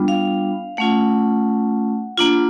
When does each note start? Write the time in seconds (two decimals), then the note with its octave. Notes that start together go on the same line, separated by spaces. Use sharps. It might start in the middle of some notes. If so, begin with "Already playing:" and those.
Already playing: G3 B3 D4 F4
0.08 F5
0.77 A3 C#4 F4 F#5
2.17 A#3 D4 F4